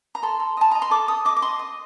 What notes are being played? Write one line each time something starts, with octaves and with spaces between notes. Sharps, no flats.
A#5
A4 C6
A4
D#5 A5
D#5 A#5
C6
A4 D6
A4 D#6
D#5 D6
D6
D#5 C6
D#5